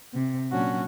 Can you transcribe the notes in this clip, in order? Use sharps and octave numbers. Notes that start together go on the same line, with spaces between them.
C3
A#2 F#3 C#4 D4 F#4